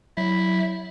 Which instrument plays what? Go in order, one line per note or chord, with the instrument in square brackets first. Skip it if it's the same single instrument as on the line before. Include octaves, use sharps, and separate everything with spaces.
[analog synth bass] F#3 [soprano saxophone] E4